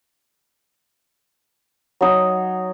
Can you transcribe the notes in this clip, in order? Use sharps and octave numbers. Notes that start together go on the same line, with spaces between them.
F#3 D#4